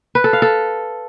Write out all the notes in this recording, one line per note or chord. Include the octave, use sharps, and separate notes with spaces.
B4
A4
F5
A4